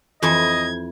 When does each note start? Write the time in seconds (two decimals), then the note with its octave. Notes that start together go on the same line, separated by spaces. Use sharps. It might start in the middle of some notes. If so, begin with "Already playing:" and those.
0.22 F2 E3 D#5 A5 G#6